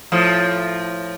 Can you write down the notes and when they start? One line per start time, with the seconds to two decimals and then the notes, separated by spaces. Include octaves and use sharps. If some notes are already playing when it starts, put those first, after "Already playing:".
0.12 A2 F3